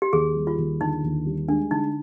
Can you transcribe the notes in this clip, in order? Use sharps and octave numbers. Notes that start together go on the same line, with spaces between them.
G4
D#2 G#4
G3
F4
D#2
D3 D#4
D#2
G3
G#3 D4
D3 D#4